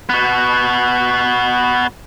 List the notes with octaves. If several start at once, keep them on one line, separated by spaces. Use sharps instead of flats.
B3 F#4